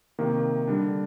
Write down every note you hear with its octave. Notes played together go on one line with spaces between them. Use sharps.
C3 D#3 A#3
D3 G3 D4